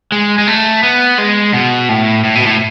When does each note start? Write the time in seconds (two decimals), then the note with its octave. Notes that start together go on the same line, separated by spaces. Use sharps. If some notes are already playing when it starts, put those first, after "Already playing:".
0.12 G#3
0.38 G#3
0.48 A3
0.83 B3
1.18 G#3
1.54 B2
1.89 A2
2.24 A2
2.35 B2
2.46 A2